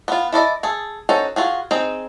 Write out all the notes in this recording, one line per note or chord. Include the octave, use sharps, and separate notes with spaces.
B3 F4
E4 A4 D5 D#5
G#4 A4
C#4 D#4 F#4 A4 C5
F4 F#4 G#4
C4 D#4 G#4 G5